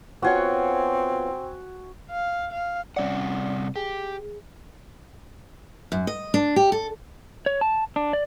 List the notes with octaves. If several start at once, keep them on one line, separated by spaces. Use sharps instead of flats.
B3 C4 F4 F#4 C#5 G#5
F5
F5
C3 G3 C#4 D5 F#5
G4 G#4
F#2
D#5
D4
G4
A4
C#5
A5
D4
D5